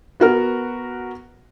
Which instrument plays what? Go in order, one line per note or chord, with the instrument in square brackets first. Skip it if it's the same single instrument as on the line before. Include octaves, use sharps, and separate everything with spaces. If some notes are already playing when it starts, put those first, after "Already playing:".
[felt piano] B3 F#4 A#4